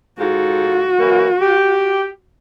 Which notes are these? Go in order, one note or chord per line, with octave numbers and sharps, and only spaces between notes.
G#2 F4 F#4 A4
E3 F#3 A#3
G4